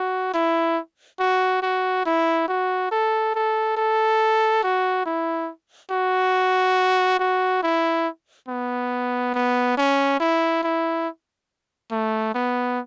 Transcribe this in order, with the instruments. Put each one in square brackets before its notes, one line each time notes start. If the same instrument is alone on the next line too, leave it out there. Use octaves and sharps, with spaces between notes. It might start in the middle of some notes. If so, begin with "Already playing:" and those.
Already playing: [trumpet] F#4
E4
F#4
F#4
E4
F#4
A4
A4
A4
F#4
E4
F#4
F#4
E4
B3
B3
C#4
E4
E4
A3
B3